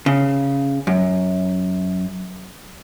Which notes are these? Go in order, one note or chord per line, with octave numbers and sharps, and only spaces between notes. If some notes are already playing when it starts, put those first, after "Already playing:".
C#3
F#2